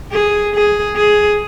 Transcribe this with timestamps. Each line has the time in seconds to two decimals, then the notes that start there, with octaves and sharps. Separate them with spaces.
0.11 G#4
0.54 G#4
0.96 G#4